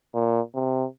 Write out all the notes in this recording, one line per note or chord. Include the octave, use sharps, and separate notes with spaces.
A#2
C3